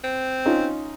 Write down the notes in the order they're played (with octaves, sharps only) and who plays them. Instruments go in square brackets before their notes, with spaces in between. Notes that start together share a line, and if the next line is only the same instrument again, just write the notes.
[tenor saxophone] C4
[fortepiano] C#4 D#4 F4